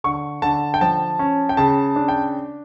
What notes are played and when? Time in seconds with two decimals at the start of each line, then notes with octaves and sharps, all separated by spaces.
0.04 D3 C#6
0.42 D3 A5
0.74 G5
0.81 F3 A5
1.19 C#4
1.49 G5
1.57 C#3 A5
1.96 D4
2.08 G5